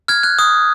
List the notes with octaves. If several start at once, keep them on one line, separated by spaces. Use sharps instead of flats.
F6 G#6
F#6
D#6